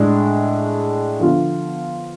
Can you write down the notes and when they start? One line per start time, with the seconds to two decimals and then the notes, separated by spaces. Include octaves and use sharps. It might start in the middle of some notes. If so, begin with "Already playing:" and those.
Already playing: A2 G#3 D4
1.20 D3 F3 B3 F4